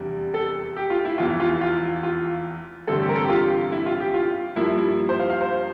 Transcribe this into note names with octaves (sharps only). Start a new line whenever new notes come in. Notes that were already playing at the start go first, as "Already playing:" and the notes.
Already playing: F1 E2 C3 G3 D4
A4
G4
F4
E4
F1 E2 E3 F4
F4
F4
F4
A1 G2 D3 A3 C4 A4
G4
A#4
A4
G4
F4
E4
F4
G4
F4
G2 F3 A#3 E4
E4
C5
F5
F5
C5